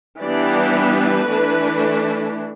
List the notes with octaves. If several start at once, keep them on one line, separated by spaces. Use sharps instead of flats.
E3 G3 B3 D4 D5
B4
E3 A3 D4